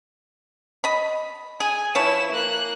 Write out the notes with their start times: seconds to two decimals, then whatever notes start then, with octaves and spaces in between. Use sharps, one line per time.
0.84 D#5 B5
1.60 G#4 G#5
1.95 F3 E4 B4 C#5 E7
2.32 A#3 F#6